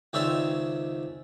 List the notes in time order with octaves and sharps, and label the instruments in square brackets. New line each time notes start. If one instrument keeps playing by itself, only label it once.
[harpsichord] C#2 D#3 C4 C#5 D5 E5